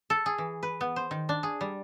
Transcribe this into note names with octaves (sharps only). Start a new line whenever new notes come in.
A4
G#4
E3
B4
B3
C5
D#3
D4
G#4
G3